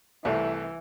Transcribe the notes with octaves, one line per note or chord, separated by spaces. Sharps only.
C2 C3 E3 A3